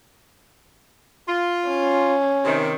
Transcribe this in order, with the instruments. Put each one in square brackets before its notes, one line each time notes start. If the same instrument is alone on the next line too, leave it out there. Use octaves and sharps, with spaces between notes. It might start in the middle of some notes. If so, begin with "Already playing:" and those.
[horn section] F4
[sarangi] C#4
[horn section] C3 D#3